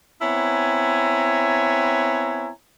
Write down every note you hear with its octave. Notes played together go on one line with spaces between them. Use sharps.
B3 C4 E4 C#5 G#5 A#5